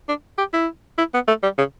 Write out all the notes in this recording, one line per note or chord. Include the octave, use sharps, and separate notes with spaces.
D4
G4
E4
E4
B3
A3
G3
C#3